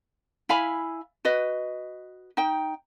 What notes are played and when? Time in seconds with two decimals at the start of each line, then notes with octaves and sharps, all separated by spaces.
0.49 E4 F5 G#5 B5
1.25 F#4 B4 D#5
2.37 D#4 G5